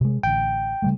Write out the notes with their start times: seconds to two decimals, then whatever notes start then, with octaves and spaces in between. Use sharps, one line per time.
0.01 C3 G#3
0.23 A1 D3 G5
0.82 C#3 G3 A3